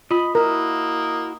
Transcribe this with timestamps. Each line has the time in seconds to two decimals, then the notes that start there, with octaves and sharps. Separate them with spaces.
0.11 F4 D#5 B5
0.35 A#3 E4 F#4 A#4 D#5